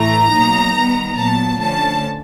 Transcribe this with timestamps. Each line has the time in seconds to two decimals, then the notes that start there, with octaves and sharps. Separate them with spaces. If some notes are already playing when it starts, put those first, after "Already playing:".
Already playing: A2 E3 A3 A#5
0.32 B2 F#3 A#3 D#4
0.75 D#3 G3 B3
1.17 A#2 F#3 B3 A5
1.59 D3 F3 A3 C#4 A5